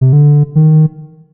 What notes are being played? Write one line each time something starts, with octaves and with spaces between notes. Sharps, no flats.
C3
D3
D#3